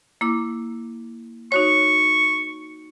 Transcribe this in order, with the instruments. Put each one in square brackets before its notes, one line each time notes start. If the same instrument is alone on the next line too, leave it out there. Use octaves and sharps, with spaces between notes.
[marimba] A#3 E4 D6
[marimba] D#4 F#4 C#5 [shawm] C#6